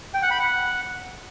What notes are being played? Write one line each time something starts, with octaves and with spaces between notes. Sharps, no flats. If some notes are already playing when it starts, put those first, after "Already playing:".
G5
F#5
B5
F#5